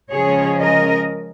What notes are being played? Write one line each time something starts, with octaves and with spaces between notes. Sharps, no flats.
C#3 F3 G#3 C#4 G#4 C#5
A#4 D#5